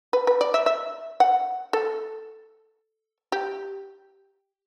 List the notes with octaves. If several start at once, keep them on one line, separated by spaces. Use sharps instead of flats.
B4
B4
D5
E5
E5
F#5
A4
G4